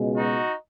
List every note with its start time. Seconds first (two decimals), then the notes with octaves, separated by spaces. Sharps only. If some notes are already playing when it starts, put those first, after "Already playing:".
Already playing: C#2 B2 G#3
0.15 D#4 F#4